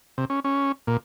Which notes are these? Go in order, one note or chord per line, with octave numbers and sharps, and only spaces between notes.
C3
C#4
C#4
A#2